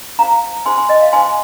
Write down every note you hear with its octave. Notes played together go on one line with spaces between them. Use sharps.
D#4 G#4 C5 F5 A#5
D#4 G#4 C5 G#5 C6
G#5 C6
D#5
F5
D#4 C5 G#5 C6